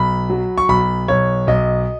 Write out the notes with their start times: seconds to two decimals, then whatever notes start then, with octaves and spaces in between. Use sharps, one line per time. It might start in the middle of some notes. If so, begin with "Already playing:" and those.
Already playing: B1 B5
0.30 F#3
0.58 C#6
0.68 B1 B5
1.08 B1 C#5
1.47 B1 D#5